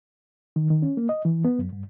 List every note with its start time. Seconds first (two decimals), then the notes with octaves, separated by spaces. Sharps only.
0.56 D#3
0.70 D#3
0.82 C#4
0.97 A#3
1.09 D#5
1.25 E3
1.45 B3
1.59 F#2
1.73 G2